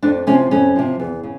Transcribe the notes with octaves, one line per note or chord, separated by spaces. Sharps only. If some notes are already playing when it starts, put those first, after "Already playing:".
F2 D4
C3 F3 C#4
F2 C#4
C3 F3
E2
C#3